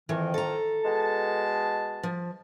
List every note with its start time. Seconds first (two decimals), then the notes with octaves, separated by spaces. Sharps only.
0.09 F2 D#3 E3
0.34 A4 A#5
0.84 B2 G#3 A5
2.03 F3